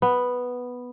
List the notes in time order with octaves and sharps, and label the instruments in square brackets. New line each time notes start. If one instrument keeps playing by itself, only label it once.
[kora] B3